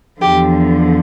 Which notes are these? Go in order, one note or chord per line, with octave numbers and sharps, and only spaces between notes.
E2 D3 F3 G4